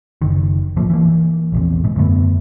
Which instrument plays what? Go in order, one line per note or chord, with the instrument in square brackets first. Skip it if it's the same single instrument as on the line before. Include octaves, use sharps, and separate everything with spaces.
[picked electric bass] F#1 D#3
B1 A2 F3 A#3
E3 A#3
A#1 E2 C3
D#1 G#2
F#2 D3 A3 B3